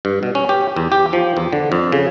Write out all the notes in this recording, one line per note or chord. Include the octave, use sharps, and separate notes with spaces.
G2
B2
C#4
G4
E2
G4
F3
E2
D3
F2
C#3